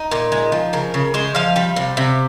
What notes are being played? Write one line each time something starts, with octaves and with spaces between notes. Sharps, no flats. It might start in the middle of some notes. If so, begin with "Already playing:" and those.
Already playing: D#4
A#2
G#3
F3
C#3 A#4
C#3
G#3 C5
F3 F5
G3
C3
C3